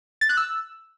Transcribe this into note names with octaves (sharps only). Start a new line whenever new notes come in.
A6
F#6
E6